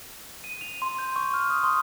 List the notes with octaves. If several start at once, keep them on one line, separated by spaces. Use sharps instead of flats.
D#7
F7
C6
G6
C#6
F6
D#6
C6